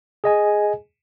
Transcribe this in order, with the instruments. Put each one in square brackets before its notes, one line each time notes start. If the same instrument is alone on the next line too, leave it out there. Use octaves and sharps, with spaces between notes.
[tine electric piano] G#4 D#5 G#5